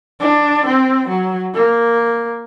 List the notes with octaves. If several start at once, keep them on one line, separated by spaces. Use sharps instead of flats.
D4
C4
F#3
A#3